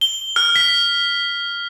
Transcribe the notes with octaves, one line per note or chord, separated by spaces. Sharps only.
G7
F6
B6